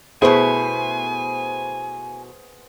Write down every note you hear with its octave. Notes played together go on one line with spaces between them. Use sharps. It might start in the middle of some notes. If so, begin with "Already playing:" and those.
B2 A3 B3 E4 G#4 C5 G#5